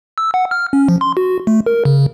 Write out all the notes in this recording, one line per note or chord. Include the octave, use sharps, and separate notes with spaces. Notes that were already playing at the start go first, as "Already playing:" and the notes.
E6
F#5
F6
C#4
F3
C6
F#4
A3
A#4
C#3